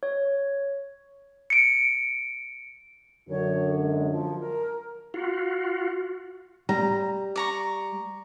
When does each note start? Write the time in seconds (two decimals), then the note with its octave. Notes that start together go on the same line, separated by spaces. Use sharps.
0.03 C#5
1.50 C#7 D7
3.29 F#2 D3 F#3 C#5
3.78 G#3
4.10 F3
4.39 A#4
5.14 F4 F#4
6.69 G3 A#5
7.36 D5 A#5 C#6